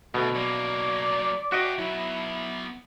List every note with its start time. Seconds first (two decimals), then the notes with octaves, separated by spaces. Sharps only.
0.14 D2 B2 A3
0.35 F#3 A#3 D5
1.52 F#4 D#5 E5 G5
1.78 F#3 B3 E4